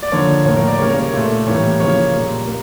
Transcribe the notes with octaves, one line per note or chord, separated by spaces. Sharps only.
D5
D3 F3 A#3 C#5
A2 F3 A#3 C#5
A#4
D5
C#3 G3 A#3 C#5
A#4
C#5
A#2 A3
A2 E3 G3 A#3 C#5
C#3 F3 A#3 C#5
A#2 G3 A#3
A#3